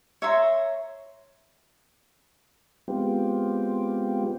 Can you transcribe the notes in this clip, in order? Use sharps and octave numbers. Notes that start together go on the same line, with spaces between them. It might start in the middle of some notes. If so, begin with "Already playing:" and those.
C#5 E5 A#5 C6
G#3 B3 C4 F4 G4